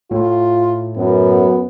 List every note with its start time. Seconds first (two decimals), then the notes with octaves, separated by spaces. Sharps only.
0.11 A2 F4
0.97 F#2 B3